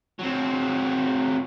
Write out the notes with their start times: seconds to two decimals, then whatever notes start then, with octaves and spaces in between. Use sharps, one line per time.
0.19 F#3 C4